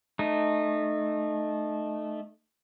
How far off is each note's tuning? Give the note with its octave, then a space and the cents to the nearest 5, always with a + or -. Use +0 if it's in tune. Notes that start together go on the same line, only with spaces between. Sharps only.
A3 -15 D#4 -25